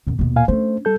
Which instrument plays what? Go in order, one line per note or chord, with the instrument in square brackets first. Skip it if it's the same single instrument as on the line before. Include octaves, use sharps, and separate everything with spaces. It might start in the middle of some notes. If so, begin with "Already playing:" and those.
[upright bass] F#2 B2
D#2 B2
[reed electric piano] A#2 F5 G#5
[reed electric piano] A3 C5 [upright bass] C#4 D4
[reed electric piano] G3 A4 G6